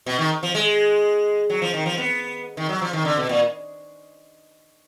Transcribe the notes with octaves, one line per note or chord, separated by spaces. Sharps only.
B2
D#3
F3
G#3
F#3
F3
D#3
F3
B3
D#3
F#3
F3
D#3
D3
B2
A#2